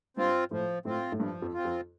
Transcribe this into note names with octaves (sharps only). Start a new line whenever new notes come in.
G2 C4 F4
A2 F3
A2 C4 F4
A2
G2 F3
F2
C4 F4
F2